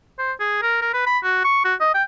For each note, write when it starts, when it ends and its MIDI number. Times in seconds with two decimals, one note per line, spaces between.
0.19 0.32 72
0.40 0.61 68
0.62 0.81 70
0.82 0.93 70
0.93 1.02 71
1.06 1.19 83
1.23 1.43 66
1.44 1.64 85
1.65 1.74 66
1.81 1.92 75
1.94 2.03 79